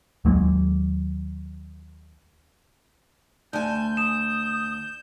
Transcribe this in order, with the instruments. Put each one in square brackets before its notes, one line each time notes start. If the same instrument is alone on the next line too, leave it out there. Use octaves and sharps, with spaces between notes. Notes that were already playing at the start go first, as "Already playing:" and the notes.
[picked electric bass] D#2 F#3 G#3 A#3
[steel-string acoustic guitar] D2 G#5 [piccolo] A5 [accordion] G6
[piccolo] D#6 [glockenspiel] E7